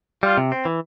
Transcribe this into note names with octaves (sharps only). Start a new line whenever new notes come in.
G3 F4
C3
C4
E3